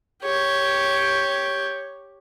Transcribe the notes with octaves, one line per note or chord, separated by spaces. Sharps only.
G4 C#5